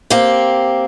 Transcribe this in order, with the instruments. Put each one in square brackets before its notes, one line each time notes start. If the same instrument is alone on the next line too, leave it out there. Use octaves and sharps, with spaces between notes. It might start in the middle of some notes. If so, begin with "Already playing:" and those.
[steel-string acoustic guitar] A#3 C4 G4